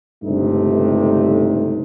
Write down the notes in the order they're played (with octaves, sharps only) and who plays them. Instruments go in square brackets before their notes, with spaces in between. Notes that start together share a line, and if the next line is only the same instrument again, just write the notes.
[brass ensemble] G1 C#2 G2 C3 A3 D#4